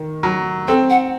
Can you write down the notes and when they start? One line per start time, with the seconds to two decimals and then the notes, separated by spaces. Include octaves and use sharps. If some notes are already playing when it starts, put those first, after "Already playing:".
Already playing: D#3
0.23 F#3
0.68 C4 A4
0.90 F#5